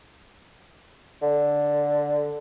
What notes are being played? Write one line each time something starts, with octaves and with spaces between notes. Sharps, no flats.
D3